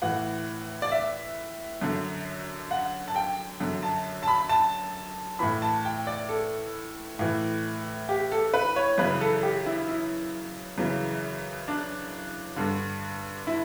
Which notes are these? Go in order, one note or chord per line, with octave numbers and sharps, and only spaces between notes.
A2 E3 F#5
D5
E5
F#2 D3
F#5
A5
G5
F#2 D3
A5
A5
B5
A5
A2 E3 B5
A5
G5
D5
A4
A2 E3
G4
A4
B4
C#5
F#2 C#3 E3 B4
A4
G4
E4
E4
F#2 C#3 E3
D4
G2 D3
E4